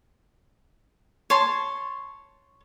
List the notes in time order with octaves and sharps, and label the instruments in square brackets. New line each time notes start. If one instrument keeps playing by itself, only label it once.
[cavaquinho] C#5 A5 C6